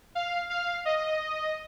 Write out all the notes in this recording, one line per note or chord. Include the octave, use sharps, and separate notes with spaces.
F5
F5
D#5